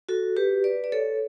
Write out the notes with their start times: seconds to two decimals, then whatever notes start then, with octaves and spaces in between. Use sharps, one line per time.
0.09 F#4 A4
0.37 G4 B4
0.64 B4 D5
0.84 D5
0.92 A4 C#5